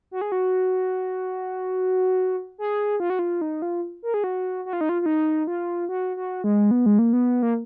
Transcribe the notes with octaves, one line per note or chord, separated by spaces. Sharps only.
F#4
G#4
F#4
G#4
F4
F#4
F4
D#4
F4
A#4
G#4
F#4
F#4
F4
D#4
F4
F4
D#4
F4
F#4
F#4
G#3
B3
G#3
A#3
B3
A#3